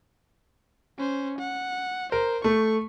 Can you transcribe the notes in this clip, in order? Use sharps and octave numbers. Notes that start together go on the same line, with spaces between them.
C#4 C5
F#5
A#4 C5
A3 C#6